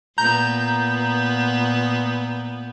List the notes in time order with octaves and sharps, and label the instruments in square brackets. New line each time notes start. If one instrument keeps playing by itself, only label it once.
[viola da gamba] A#2 B3 [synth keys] A#5 G6